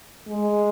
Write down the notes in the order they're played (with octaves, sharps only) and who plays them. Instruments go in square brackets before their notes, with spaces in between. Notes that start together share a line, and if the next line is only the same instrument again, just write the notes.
[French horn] G#3